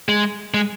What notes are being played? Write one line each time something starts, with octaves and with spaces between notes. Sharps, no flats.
G#3
G#3